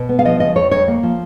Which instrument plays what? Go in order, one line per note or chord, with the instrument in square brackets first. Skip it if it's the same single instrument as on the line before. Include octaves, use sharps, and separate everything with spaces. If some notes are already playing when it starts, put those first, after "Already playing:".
Already playing: [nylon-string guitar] B2
B3
F5
F3 D#5
C#3 D#5
F2 C#5
F2 C#5
A#3
F3